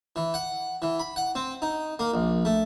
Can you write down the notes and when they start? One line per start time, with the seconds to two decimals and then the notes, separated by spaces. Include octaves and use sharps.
0.16 E3
0.34 F#5
0.82 E3
1.00 B5
1.16 F#5
1.35 C4
1.62 D#4
1.99 A#3
2.14 A#1
2.45 A3